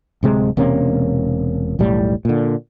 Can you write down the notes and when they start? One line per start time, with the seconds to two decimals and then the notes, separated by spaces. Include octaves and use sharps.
0.23 D1 C3 G#3
0.57 E1 C3 A#3 C#4
1.79 E1 B1 A2 G3
2.25 A#2 D3